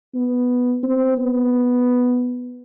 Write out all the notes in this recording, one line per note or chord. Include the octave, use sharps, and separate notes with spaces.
B3
C4
B3